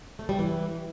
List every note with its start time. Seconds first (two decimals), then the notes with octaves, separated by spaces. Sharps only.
0.19 A3
0.29 G3
0.39 E3